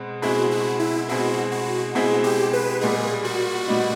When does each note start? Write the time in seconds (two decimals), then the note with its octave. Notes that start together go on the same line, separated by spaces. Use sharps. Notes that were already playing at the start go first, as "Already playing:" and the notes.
Already playing: B2 G#3 C4
0.22 B2 G#3 C4 E4 F#4 G#4
0.51 F#4
0.79 E4
1.09 B2 G#3 C4 E4 F#4 G#4
1.52 F#4
1.95 B2 G#3 C4 E4 F#4 G#4
2.24 G4
2.53 B4
2.81 A#2 G3 B3 D#4 G#4
3.24 F#4
3.68 A#2 G3 B3 D#4